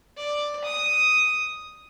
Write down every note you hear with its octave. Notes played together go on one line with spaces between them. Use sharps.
D5
D#6